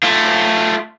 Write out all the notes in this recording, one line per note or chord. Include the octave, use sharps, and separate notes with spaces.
A3 F4